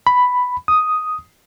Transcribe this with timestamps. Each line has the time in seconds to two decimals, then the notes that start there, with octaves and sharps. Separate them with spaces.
0.07 B5
0.68 D#6